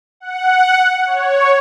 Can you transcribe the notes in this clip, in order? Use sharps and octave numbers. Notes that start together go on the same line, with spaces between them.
F#5
C#5